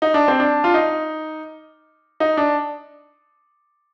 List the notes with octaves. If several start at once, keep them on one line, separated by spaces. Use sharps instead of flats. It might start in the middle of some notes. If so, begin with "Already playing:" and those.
D#4
D4
C4
D4
F4
D#4
D#4
D4